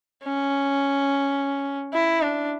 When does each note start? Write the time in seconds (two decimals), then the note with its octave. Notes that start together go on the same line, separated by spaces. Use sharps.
0.24 C#4
1.93 E4
2.22 D4